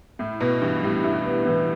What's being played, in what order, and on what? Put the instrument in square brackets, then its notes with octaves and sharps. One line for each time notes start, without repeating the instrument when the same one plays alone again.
[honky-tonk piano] A2 [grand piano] E4
[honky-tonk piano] B2 [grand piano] B3
[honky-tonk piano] G2 [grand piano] E3
[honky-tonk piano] A2 [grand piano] G3
[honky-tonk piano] G2 [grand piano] E4
[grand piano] B3
[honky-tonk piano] A2 [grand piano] E3